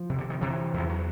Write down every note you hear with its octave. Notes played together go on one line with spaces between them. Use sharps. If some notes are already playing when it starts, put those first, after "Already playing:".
Already playing: F3
C3
D3
D#3
C3 E3
E2 F3
F#3